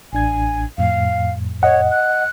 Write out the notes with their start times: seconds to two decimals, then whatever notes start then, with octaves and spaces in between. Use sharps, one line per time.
0.13 A1 D4 G#5 G#6
0.78 F2 A2 F5
1.63 C#5 D#5 F#5
1.91 F#6